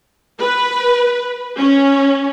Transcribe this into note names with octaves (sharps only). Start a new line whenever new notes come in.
B4
C#4